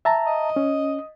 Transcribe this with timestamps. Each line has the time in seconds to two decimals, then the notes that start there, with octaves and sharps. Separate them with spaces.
0.05 E5 A5 A#5
0.26 D#5
0.56 C#4